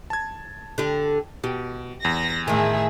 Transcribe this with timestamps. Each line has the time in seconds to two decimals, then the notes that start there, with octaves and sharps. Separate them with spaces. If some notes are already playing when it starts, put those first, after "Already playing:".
0.10 A5 G#6
0.78 D3 G4
1.44 B2 G4
2.05 E2 A#6
2.48 A2 D#3 G#4 E5